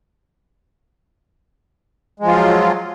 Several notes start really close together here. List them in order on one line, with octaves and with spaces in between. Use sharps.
G#3 F3 F4 F#3